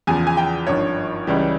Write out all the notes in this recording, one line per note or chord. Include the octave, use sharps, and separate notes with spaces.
E2 C#3 F3 G#5
G#5
G5
G#1 G2 F3 C#5
C#2 C#3 E3 G3